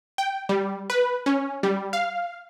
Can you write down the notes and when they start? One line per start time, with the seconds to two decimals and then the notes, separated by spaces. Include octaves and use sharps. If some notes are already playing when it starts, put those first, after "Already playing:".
0.18 G5
0.49 G3
0.90 B4
1.26 C#4
1.63 G3
1.93 F5